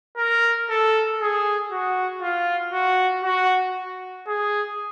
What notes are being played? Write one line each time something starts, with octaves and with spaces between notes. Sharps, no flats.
A#4
A4
G#4
F#4
F4
F#4
F#4
G#4